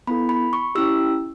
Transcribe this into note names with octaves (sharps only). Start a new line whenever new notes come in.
B3 E4 A4 B5
B5
C#6
C#4 E4 G4 E6